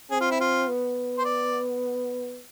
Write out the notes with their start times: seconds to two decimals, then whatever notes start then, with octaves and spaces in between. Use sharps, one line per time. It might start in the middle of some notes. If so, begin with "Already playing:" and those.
0.11 C4 G#4
0.21 F4
0.31 E4
0.40 F4
0.68 B3
1.18 C5
1.25 D5